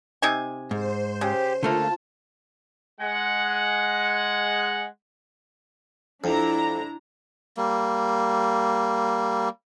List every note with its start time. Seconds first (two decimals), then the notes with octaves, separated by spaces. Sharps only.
0.22 C3 D#4 G#5
0.71 G#2 C5
1.21 C#3 G4
1.63 D3 A3 A#3 F4 A5
3.01 G#3 F#5
6.24 F2 D4 E4 A#5
7.57 G3 A#3